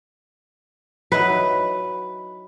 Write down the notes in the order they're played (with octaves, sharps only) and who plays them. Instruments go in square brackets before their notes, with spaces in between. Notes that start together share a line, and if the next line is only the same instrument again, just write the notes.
[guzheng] F#3 D#4 E4 [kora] B4